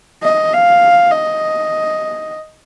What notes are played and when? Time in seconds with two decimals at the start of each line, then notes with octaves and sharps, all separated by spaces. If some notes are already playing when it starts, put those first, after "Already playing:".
0.23 D#5
0.53 F5
1.12 D#5